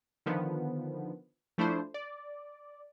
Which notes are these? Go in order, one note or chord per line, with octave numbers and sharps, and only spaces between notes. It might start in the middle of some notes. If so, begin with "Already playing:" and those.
D3 D#3 F3 B3
F3 A3 D4 E4 C5
D5